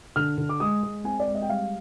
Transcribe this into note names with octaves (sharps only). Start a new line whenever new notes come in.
D3 F6
D3
D6
G#3 D#6
G#3
C4 G#5
D5
G#3
D#5
G5
G3 F5